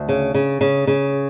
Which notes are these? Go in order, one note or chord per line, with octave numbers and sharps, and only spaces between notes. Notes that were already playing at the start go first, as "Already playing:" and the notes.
Already playing: D2
C#3
C#3
C#3
C#3